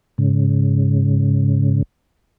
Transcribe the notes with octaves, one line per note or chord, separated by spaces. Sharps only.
G#2 C#3